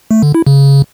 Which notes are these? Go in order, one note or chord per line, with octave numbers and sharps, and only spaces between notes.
A3
D3
E4
C#3